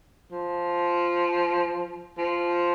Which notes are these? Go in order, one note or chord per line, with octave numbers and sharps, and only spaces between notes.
F3
F3